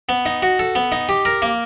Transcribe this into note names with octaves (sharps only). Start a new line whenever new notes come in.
B3
D#4
F#4
A4
B3
D#4
G4
A#4
A#3